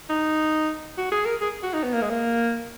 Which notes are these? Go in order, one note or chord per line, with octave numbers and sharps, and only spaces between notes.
D#4
F#4
G#4
A#4
G#4
F#4
D#4
B3
A#3
G#3
A#3